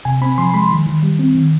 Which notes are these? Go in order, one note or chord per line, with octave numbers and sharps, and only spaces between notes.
C3 G#5
C4 B5
F3 C6
G#3 B5
D#3
D#3
G3
C4
D#3